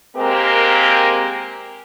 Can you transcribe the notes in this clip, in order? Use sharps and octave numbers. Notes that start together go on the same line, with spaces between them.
G#3 A#3 C4 G4 A#4